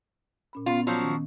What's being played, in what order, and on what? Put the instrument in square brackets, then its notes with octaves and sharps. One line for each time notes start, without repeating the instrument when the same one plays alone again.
[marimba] A#2 C#4 B5
[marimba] B3 C#4 [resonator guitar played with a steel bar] F4
[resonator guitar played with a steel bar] F3 F#3 [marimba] F5 G6
[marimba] D#3 C#4